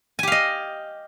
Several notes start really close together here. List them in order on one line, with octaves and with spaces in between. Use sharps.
G#5 G4 F5 D#5